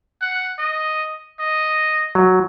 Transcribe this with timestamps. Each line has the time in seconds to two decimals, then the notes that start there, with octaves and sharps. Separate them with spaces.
0.21 F#5
0.59 D#5
1.40 D#5
2.15 F#3